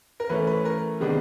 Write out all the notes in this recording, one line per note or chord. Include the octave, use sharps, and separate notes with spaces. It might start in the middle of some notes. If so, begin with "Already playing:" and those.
A#4
E3 A3 C#4 B4
B4
A#4
C3 D#3 G#3 B3 D4